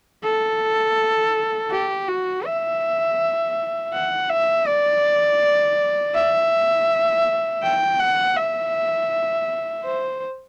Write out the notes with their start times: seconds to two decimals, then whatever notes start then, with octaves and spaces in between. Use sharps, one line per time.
0.23 A4
1.71 G4
2.08 F#4
2.45 E5
3.94 F#5
4.30 E5
4.67 D5
6.14 E5
7.63 G5
7.99 F#5
8.36 E5
9.85 C5